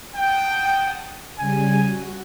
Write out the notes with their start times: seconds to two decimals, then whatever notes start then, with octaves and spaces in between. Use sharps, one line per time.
0.15 F#5 G5 A5 D#6
1.38 C#3 G3 G#5
1.85 F#4